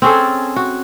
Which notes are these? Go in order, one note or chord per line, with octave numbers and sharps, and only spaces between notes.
C4 C#4 G#4 A4
F#4